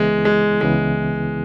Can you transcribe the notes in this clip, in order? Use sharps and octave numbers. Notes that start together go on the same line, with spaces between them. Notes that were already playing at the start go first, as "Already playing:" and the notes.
Already playing: C#2 C#3 E3 G#3 B3 E4
G#3
C#2 C#3 E3 G#3 B3 E4